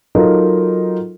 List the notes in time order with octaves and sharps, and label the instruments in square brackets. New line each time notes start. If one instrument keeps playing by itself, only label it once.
[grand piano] F#3 D#4 F4 A4 A#4